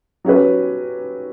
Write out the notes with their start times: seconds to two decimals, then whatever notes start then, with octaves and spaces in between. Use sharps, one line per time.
0.24 F#3 C#4 G4 B4